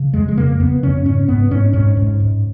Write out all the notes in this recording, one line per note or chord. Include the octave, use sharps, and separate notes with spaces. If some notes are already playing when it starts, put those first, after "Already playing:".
Already playing: C#3
F2 G#3
G#3
C#3 A#3
F2 B3
C#3 C#4
G#2 C#4
G#2 B3
G#2 C#4
G#2 C#4
G#2
G#2